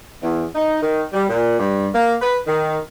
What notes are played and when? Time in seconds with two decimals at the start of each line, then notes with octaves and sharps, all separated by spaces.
0.22 E2
0.55 D#4
0.81 D#3
1.12 G3
1.28 A#2
1.58 G2
1.93 A#3
2.20 B4
2.47 D#3